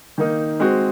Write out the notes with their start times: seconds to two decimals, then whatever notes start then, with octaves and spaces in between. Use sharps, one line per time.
0.18 D#3 A#3 D#4
0.60 G#3 C4 F#4